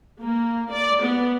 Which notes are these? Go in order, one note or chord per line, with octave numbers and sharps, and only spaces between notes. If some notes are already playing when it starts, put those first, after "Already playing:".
A#3
D5
B3